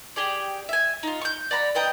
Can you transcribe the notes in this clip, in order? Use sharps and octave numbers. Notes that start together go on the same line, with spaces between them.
G4 G#4 D5
E5 G#5
D#4 F4
C#6 G6
D5 F#5 A#5 B5
B4 D#5 G5 A#5